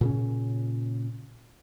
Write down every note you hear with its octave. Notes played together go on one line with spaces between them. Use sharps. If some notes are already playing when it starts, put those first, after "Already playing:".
A#2 C#3 C#4